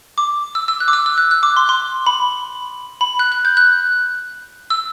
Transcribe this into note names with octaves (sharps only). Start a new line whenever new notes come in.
D6
E6
E6
F#6
D6
E6
E6
F#6
F#6
D6
C6
C6
B5
B5
F#6
F#6
G6
F#6
E6